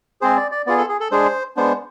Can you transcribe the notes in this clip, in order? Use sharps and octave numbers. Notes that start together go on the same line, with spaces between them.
G#3 C4 G#4 C5
D5
D5
B3 F4 G#4 D5
A4
G#4
A4
G#3 D4 G#4 C5
G#3 B3 D4 C5